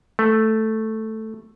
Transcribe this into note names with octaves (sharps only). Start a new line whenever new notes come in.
A3